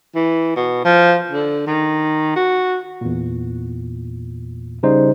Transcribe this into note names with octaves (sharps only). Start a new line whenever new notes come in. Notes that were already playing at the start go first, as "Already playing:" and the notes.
E3
B2
F3
D3
D#3
F#4
E2 A#2
C#3 G3 D#4 C5